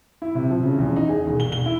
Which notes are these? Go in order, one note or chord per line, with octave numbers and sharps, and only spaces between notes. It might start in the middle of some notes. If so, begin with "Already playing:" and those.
E4
C3
F3
C#3
E2
D#4
G#4
E1
G7
G7
E4